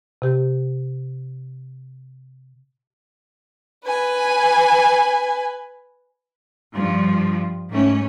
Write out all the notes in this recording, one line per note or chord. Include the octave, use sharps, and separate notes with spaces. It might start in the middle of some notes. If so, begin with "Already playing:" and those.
C3 G4
B4 G#5
G2 F3
G#2 A3 C#4